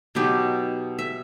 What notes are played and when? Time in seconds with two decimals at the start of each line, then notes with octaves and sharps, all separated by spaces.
0.15 B2 F#3 B3 D#4 G4
0.99 E5